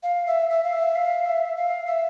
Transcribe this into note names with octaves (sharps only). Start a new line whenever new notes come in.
F5
E5
E5
F5
E5
F5
E5
F5
E5